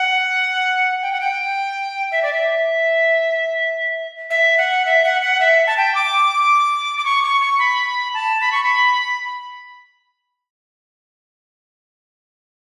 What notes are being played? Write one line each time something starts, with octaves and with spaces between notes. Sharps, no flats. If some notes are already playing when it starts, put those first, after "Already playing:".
Already playing: F#5
G5
F#5
G5
E5
D5
E5
E5
F#5
E5
F#5
F#5
E5
A5
G5
D6
D6
C#6
C#6
C#6
B5
A5
B5
C#6
B5